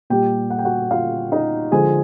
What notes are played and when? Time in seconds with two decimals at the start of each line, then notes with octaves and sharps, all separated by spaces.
0.10 A#2 G3 G4 G5
0.50 F#5
0.59 G5
0.65 F#4 F#5
0.91 F4 F5
1.32 D#4 D#5
1.72 D3 F3 G#3 G#4 G#5